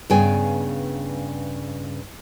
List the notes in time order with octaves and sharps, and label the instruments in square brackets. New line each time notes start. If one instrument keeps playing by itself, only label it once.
[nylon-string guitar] G2 C#3 B3 G#4 G5 G#5